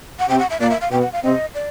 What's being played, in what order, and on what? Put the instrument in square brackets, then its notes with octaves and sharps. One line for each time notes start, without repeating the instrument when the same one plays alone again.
[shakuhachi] F#5
[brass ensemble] C3 C4 [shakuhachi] G5
[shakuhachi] F#5
E5
[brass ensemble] A#2 A#3 [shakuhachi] D5
[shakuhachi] E5
F5
[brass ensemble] B2 B3 [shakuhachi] G5
[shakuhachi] F#5
F5
[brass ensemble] C3 C4 [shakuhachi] D#5
[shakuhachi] D5